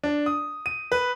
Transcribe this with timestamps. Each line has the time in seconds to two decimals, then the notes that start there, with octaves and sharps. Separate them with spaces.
0.04 D4
0.26 D#6
0.66 D#7
0.92 B4